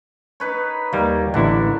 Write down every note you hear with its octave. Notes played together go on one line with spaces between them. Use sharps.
D#4 B4 C#5
D#2 G3 A#3
A1 D3 D4 E4 C#5